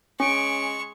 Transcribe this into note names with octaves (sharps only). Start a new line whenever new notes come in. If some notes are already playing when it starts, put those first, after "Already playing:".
G#3 C#4 C#6 D7